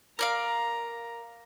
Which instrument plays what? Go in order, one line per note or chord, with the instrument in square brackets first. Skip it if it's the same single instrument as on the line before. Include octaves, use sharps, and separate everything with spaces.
[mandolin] A#4 D5 F5 [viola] A#5